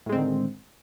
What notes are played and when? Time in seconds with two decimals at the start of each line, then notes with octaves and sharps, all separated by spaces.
0.06 A2
0.09 G#3
0.12 C4
0.15 D3
0.19 D#3